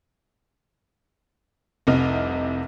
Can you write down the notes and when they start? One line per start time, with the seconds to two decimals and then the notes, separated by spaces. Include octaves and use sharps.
1.87 F1 C2 C3 D#5 F6